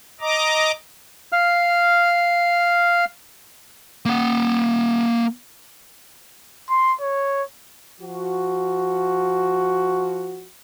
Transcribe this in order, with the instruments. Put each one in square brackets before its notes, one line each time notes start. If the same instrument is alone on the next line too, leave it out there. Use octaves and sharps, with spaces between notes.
[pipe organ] D#5 A#5 D6
[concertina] F5 F6
[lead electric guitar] A#3 F#5
[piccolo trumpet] C6
C#5
[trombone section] F3 F#4